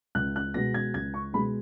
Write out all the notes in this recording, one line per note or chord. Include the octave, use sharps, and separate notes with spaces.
C#2 F#6
F#6
B2 G#3 A#6
G#6
C#2 G#6
C#6
B2 G#3 B5